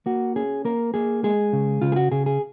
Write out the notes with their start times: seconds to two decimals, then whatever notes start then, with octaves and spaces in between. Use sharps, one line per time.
0.06 A#3 F#4
0.36 C#4 G#4
0.65 A#3 A#4
0.94 A#3 G#4
1.24 G#3 G#4
1.53 C#3
1.82 C#3 F4
1.92 G#4
1.96 F#4
2.12 C#3 G#4
2.26 G#4